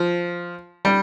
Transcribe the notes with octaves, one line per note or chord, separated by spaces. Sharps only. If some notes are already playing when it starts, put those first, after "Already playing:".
Already playing: F3
G3